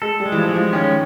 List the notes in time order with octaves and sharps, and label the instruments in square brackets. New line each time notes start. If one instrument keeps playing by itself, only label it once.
[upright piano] G#3 [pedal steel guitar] A4
[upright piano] G3
[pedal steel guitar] G#3
[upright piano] E3
F3
[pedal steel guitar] G#3
[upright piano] F3
[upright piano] D#3 [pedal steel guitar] C#4